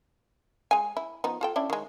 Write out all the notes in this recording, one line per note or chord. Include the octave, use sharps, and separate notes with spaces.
G#3 G#5
E4
F3 B3 D#4
F4 A4 G5
C#4 D4 E4
D#3 G#3